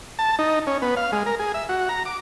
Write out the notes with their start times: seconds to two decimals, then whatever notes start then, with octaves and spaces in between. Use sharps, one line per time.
0.19 A5
0.39 D#4
0.67 C#4
0.82 B3
0.97 F5
1.12 G#3
1.26 A#4
1.39 G#4
1.54 E5
1.69 F#4
1.89 A#5
2.06 D6